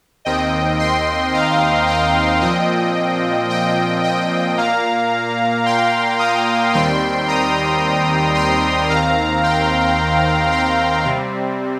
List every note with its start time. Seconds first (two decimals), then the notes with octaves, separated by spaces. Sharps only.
0.25 D#2 D#3 C4 D#5 G5
0.79 G5 C6
1.34 F5 A#5
1.87 D#5 G5
2.41 A#2 F3 C4 D#5 G5
3.50 D#5 G5
4.03 D#5 G5
4.57 A#2 A#3 F5 A#5
5.66 G5 C6
6.19 A#5 D#6
6.73 D#2 D#3 G3 C4 G5 C6
7.27 A#5 D#6
8.35 G5 C6
8.89 D#2 D#3 C4 F5 A#5
9.43 G5 C6
10.51 G5 C6
11.05 C3 G3 C4